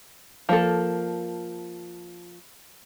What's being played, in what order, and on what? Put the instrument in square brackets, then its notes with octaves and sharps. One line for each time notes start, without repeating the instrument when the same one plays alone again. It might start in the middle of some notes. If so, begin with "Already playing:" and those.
[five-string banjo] F3 A#3 A4